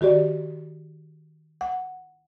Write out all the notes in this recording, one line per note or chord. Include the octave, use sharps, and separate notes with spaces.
D#3 F#4 G4 D5
F#5